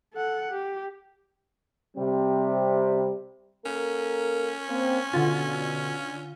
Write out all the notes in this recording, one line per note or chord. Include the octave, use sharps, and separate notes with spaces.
A4 F#5
G4
C3 G3 C4
A#3 C#4 A4 A#4
A#3 C4
B2 D3 F4